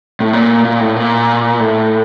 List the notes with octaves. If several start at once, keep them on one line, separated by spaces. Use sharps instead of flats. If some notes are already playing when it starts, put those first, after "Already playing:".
A2
A#2
A#2
A2
A#2
A2